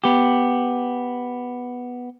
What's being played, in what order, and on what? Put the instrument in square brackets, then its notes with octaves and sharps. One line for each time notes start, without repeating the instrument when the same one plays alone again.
[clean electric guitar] B3 G4